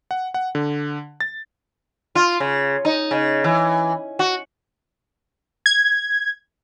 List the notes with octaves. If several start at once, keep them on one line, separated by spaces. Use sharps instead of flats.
F#5
F#5
D3
A6
F4
C#3
D#4
C#3
E3
F#4
G#6